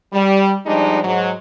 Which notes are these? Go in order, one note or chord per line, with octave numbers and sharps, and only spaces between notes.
G3
F3 G3 G#3 D4 D#4
G#2 F#3